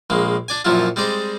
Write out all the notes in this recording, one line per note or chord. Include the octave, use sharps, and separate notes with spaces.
A#1 G#3 A#3
D4 D5 G#5
F#2 A#2 F3 F#3 E4 F4
G3 G#3 C4 D5 D#5